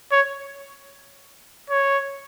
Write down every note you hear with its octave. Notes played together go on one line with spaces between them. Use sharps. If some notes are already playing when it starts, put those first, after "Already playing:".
C#5
C#5